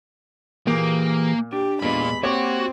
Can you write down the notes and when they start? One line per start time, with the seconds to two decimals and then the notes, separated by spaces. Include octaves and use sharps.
0.67 A#2 E3 A#3 G4 G#4
1.53 D4 G4
1.82 E2 A#2 G#3 B5
2.23 A#3 C4 F#4 G4 C#5 D6